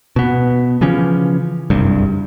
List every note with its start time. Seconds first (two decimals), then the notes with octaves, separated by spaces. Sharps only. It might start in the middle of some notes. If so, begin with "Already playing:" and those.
0.16 B2 B3
0.81 C#3 E3 F3 C#4
1.70 F#1 C2 G2